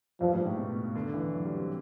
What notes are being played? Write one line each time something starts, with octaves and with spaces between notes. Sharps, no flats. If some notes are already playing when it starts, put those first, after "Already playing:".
G2 F3
G#2
A2
B2
D3
E3
F#3
G3
C4